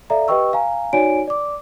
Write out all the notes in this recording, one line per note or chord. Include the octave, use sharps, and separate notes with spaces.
A4 D5 E5 F5 A#5
G4 B4 D#5 G5 C#6 E6
F5 G#5 A#5
D#4 F#4 C#5 D5 G#5 D7
D5 D6